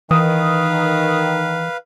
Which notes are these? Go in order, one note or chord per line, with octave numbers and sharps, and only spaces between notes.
D#3 E3 B4 F5 D#6